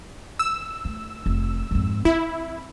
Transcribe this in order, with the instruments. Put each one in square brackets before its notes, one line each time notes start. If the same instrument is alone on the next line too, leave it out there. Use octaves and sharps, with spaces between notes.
[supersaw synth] E6
[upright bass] A3
F1
F2 G#2
[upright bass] C4 [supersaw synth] E4